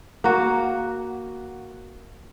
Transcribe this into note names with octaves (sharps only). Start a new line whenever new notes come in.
A#3 F#4